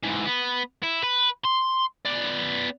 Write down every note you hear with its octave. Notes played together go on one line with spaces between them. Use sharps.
G#2 E3
B3
E4
B4
C6
B3 D5